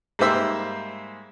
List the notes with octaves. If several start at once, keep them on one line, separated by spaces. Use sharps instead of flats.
G#2 G3 A#3 C5 E5 E6